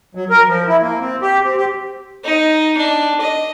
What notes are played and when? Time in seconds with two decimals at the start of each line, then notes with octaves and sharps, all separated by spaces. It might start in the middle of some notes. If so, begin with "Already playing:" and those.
0.15 F#3
0.30 A#4
0.47 F3
0.68 E4
0.81 A#3
1.00 C4
1.22 G4
1.44 C4
1.57 G4
2.24 D#4
2.77 D4
3.21 D#5